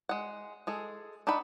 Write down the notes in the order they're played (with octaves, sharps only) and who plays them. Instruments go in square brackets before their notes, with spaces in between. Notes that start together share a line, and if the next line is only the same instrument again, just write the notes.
[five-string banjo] G#3 F#5
G#3 G#4 A4
D4 D#4 A4 F#5 B5